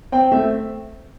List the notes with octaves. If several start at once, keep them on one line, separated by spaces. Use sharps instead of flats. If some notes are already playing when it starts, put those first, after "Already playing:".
C4 G5
A3 E5